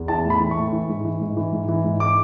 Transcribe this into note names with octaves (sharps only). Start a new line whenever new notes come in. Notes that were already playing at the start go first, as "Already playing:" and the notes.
Already playing: E2
E3 A5
A2
B5
E3
C#6
A2
E3
G#2
E3
G#2
E3
G#2
E3
G#2
D6